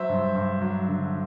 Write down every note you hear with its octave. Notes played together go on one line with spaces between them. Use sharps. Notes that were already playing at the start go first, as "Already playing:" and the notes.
Already playing: F#3 C5 E5
G2
G2
F#3
D3